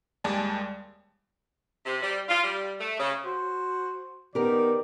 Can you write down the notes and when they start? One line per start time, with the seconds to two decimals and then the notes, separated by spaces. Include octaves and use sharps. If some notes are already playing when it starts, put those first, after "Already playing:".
0.24 D#2 G3 G#3 D5 G#5 A5
1.86 C3
2.03 G3
2.29 F4
2.44 G3
2.80 A3
2.99 C#3
3.25 F#4 C5
4.35 D#3 B3 G4 A#4 D5